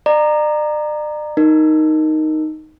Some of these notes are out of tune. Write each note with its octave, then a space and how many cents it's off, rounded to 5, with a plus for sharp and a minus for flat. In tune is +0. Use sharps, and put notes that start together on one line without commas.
D5 +40 A#5 -5
D#4 +0 A#4 +0